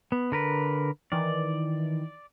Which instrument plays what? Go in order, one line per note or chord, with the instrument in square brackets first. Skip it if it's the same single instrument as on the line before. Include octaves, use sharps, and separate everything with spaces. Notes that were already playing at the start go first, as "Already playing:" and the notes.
[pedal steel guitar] B3
D3 A#4 B4
[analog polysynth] D#3 E3 [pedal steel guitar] D5